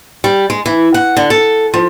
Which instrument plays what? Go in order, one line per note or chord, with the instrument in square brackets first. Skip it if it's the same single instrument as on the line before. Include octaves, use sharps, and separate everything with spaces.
[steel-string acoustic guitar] G3
G#3
E3
F#5
D3
A4
F3